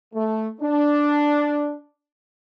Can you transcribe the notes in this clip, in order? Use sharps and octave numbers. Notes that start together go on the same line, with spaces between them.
A3
D4